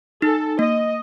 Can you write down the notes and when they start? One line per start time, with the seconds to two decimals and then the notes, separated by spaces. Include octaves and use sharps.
0.22 D#4 A4
0.59 A#3 D#5